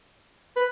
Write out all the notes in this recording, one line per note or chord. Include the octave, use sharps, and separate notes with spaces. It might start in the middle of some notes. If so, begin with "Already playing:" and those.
B4